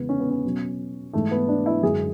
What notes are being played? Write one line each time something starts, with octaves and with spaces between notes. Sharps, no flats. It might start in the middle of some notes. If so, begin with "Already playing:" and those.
Already playing: E2 C#3 G#3 B3
C#4
B3
C#4
B2 F#3
G#2 E3 G#3 A3
B3
D4
E4
F#2 D3 G#3 G#4